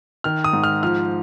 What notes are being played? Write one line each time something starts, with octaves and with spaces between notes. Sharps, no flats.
D#3 F6
D#6
G#2
F6
F3 F6